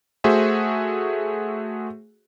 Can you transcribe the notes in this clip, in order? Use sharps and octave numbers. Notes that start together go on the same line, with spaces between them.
A3 F#4 G#4 C5 E5